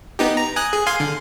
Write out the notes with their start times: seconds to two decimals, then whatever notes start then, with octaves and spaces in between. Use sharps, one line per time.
0.19 B3 D#4 G4
0.37 A#5
0.56 G#5 D#6 F#6
0.73 G#4
0.87 F5 G#5 C6
1.00 D3